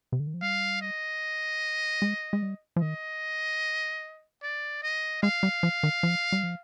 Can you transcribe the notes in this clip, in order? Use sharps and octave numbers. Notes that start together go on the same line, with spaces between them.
C3
D3
D#3
F3
G3 F5
D#5
G#3
G#3
G3
F3
D#3 D#5
D5
D#5
G#3 F5
G3
F3
D#3
F3
G3
F3